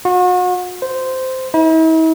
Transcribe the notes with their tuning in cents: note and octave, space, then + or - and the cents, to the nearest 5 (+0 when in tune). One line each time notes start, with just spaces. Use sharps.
F#4 -40
C5 -10
E4 -45